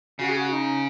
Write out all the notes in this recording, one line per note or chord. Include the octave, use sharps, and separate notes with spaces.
C#3 F#4
G#4
F#4
D#4